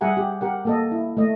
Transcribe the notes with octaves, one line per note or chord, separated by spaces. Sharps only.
G3 G#4 E5 F#5 G#5 A#5
G4
G4 A#4 F#5
A#3 A4 D#5
E4
A3 D#5